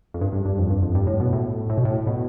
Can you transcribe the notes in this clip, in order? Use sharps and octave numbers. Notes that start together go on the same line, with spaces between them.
F2
G2
G2
G2
F2
G2
F2
G2
A2
B2
A2
A2
B2
A2
B2